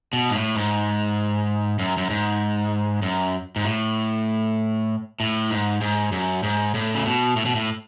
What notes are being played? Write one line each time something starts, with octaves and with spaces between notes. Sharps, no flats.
B2
G#2
A2
G#2
F#2
F#2
G#2
F#2
G#2
A2
A2
G#2
G#2
F#2
G#2
A2
C#3
B2
A2
B2
A2